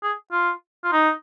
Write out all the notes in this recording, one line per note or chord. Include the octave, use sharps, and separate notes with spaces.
G#4
F4
F4
D#4